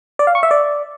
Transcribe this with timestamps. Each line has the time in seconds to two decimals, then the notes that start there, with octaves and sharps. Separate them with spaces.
0.19 D5
0.27 F5
0.35 C#6
0.43 E5
0.51 D5